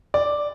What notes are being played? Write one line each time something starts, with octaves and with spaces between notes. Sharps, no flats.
D5